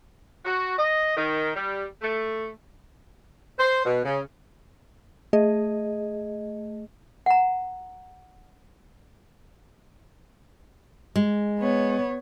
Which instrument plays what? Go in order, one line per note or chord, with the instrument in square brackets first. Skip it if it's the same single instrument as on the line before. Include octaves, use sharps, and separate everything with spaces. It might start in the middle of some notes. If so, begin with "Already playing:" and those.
[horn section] F#4
D#5
D#3
G3
A3
[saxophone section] C5
B2
C#3
[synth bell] A3 G#4 D#5
[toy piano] F#5 A#5
[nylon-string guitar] G#3
[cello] B3 C#5